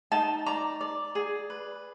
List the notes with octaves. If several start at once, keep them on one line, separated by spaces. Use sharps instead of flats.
D#4 A5
D5 A#5
D5
G#4
B4